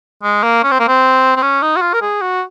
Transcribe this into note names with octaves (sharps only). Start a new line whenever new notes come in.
G#3
A#3
C#4
C4
A#3
C4
C4
C#4
D#4
F#4
F4
A#4
G#4
F#4